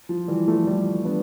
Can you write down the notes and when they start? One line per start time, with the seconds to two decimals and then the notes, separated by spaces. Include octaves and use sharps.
0.09 F3
0.28 E3 G3
0.48 F3 A3
0.67 E3 G3
1.04 B3 D4